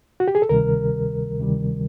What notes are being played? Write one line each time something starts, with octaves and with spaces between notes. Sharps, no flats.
F#4
G4
G#4
A4
D2 C3 D#3 G3 A#4
D2 C3 D#3 G3